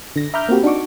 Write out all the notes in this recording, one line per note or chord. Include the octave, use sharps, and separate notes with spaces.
D3 A#6
E5 A#5 B5 D6 F6 G6
A#3 C4 F#4 G4
D4 D#4 F#4 C#6 D6